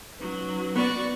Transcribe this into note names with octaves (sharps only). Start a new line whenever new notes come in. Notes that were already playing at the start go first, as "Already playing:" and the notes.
F#3 C#4 D#4 B4
B3 F#4 D5 C#6